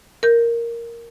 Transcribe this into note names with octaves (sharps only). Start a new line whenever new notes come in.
A#4 G6